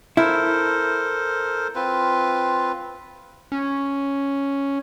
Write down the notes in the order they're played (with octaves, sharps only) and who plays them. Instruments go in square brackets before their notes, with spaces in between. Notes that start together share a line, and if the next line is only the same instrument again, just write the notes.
[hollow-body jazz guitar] E4 [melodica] A4 A#4 C5
[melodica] C4 F4 B4
[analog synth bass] C#4